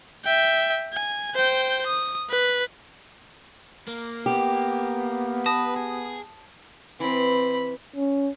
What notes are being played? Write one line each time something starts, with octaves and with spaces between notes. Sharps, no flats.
E5 G5
G#5
C5 G5
D#6
B4
A#3
B3 G4
B4 A5 D#6 A#6
G#4
E3 C4 B5
C#4